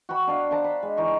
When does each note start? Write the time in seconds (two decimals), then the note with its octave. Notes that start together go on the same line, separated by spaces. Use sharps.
0.09 F#4 F#5 G5 B5
0.27 D4 D5 F5
0.51 D4 C5 A5 A#5
0.64 B5
0.83 G#3
0.97 E3 D#4 C#6